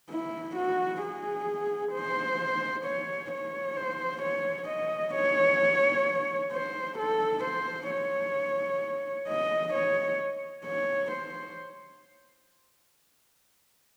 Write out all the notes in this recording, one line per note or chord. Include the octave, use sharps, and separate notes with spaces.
E4
F#4
G#4
C5
C#5
C#5
C5
C#5
D#5
C#5
C5
A4
C5
C#5
D#5
C#5
C#5
C5